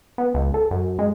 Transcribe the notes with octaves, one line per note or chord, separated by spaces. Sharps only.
B3
C#2
A4
F#2
G#3